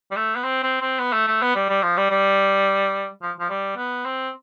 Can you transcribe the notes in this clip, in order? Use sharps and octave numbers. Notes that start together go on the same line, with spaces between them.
G3
A3
B3
C4
C4
C4
B3
A3
A3
B3
G3
G3
F3
G3
G3
F3
F3
G3
B3
C4